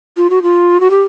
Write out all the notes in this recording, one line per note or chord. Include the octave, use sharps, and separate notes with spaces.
F4
F#4
F4
F#4
G4